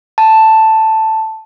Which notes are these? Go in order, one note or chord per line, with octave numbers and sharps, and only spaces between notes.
A5